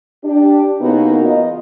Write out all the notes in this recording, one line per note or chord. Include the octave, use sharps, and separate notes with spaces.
D4 G4
C#3 A#3 B3 D#4 E4 F#4
E2 B3 F4 D#5